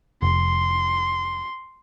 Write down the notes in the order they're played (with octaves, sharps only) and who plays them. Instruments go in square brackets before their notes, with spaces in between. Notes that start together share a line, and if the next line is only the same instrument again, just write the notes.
[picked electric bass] F1 [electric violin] C6